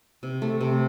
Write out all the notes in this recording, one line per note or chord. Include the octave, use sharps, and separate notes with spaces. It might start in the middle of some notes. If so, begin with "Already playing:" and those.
C3
A3
C3